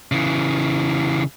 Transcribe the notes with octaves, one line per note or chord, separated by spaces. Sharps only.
C#3 E3